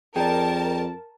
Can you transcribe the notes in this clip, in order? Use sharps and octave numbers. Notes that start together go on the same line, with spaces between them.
F2 G#4 A#4 D5 G5 A5